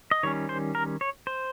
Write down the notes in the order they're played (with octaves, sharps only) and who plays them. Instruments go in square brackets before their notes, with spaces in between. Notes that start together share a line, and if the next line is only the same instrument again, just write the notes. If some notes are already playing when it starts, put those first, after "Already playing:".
[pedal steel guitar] D#5
D#3 G3 C#4 C#5
C5
A#4
C#5
C5